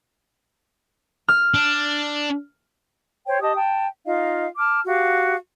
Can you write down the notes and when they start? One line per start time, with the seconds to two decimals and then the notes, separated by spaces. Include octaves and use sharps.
1.28 F6
1.54 D4
3.26 C5 C#5 G5
3.41 G4 D#5 A5 D#6
3.55 G5 A5
4.06 D#4 F4 D#5 F5
4.57 A5 D6 F6
4.86 F#4 G4 F5